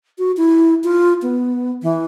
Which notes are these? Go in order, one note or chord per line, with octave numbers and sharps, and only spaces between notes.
F#4
E4
F4
B3
E3